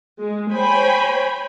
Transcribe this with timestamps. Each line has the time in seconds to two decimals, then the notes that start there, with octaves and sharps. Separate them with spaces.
0.20 G#3
0.52 C5 C#5 G5 G#5 B5